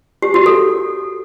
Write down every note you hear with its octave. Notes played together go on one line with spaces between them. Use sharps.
G4
F#4
A4